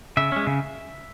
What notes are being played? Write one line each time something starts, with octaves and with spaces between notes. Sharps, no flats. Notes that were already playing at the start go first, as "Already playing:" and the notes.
C#3 E5
G#3 C#4
C#3